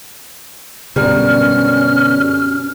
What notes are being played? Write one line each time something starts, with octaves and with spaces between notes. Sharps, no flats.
F#2 B2 D3 G3 C#4 F6